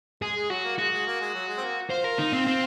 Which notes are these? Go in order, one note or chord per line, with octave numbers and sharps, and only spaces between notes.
G#3 G#4
G#3
F#3 F#4
A#3
G#3 F#4
G#3
A#3
G#3
F#3
G#3
C4
A#3
F4 C5
A#4
D#4
C4
C4